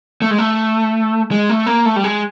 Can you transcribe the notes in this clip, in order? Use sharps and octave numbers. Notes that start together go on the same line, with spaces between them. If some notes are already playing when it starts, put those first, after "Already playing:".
A3
G#3
A3
G#3
A3
A#3
A3
G3
G#3